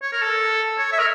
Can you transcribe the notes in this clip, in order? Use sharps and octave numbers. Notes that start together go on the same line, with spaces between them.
C#5
A#4
A4
C#5
E5
A#4